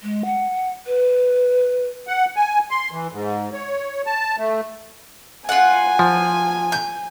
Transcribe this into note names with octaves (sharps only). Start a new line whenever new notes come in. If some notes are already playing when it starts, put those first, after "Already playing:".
G#3
F#5
B4
F#5
G#5
C6
E3
G#2
C#5
A5
A3
F4 F#5 G#5
F3
G6